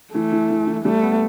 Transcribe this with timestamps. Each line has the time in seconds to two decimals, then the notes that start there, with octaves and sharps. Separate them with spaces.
0.14 E3 A3
0.32 E3
0.50 E3
0.67 E3
0.85 G3 A3
1.03 B3